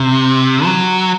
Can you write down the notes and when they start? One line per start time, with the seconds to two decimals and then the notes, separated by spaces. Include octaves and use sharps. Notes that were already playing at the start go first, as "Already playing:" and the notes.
Already playing: C3
0.65 F#3